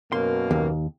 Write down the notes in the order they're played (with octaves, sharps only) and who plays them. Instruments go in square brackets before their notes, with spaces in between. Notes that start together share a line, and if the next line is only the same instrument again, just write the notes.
[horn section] F#2 B2 A#3 [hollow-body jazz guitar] C6
[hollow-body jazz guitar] D#2